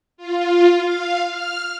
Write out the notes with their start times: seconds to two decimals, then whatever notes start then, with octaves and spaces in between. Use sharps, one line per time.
0.17 F4
0.82 F5
1.23 F6